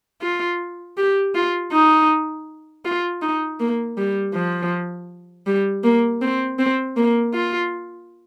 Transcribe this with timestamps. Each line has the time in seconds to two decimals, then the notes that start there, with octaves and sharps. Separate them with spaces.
0.22 F4
0.97 G4
1.35 F4
1.72 D#4
2.85 F4
3.22 D#4
3.60 A#3
3.97 G3
4.34 F3
5.47 G3
5.84 A#3
6.22 C4
6.59 C4
6.97 A#3
7.34 F4